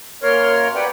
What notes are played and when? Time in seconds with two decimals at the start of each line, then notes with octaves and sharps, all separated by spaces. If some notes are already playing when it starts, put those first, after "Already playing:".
0.23 F#2 A#3 A#4 C#5 C6 F6
0.75 G4 B4 D5 F#5 G5